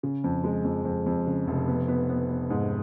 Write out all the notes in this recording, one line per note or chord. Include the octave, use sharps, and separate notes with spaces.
C#3
F2
G#3
F2
F2
F2
C#3
F1
B3
B3
B3
B3
G#2